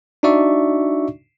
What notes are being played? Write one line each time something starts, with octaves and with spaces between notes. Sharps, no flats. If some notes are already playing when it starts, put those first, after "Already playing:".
D4 D#4 F#4 D5 E5 C#6